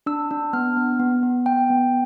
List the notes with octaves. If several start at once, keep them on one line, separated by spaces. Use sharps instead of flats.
D4 E6
D4
B3 F6
B3
B3
B3
B3 G5
B3